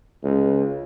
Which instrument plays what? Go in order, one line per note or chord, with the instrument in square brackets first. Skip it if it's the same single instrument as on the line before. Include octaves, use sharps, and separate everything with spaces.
[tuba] C#2